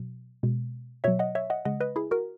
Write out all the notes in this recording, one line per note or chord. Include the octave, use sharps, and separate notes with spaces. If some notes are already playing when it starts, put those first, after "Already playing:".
Already playing: B2 F#3
B2 G#3
B2 F#3 C#5 E5
D#5 F#5
C#5 E5
D#5 F#5
C#3 G#3 D#5 F#5
B4 D#5
E4 G#4
F#4 A#4